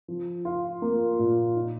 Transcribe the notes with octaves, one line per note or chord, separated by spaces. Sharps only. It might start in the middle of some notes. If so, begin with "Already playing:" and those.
F3
F4
A#3
A#2
D#4